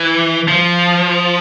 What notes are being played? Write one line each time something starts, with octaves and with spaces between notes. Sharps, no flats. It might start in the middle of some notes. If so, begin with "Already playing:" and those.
Already playing: E3
F3